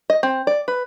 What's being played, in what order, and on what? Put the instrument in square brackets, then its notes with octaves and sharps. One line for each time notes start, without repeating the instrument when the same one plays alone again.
[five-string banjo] D#5
C4
D5
B4